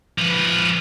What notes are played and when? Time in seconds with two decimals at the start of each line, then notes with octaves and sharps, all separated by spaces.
0.18 F3 B4